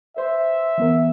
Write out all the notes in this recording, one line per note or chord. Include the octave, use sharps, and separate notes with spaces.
B4 C5 E5 C6
E3 B3 A#4